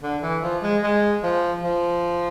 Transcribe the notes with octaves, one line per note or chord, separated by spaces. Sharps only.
D3
E3
F3
G#3
G#3
F3
F3